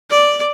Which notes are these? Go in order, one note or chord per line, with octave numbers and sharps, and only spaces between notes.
D5